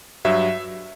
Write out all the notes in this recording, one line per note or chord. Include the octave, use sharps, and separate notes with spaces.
G2 F#3 E5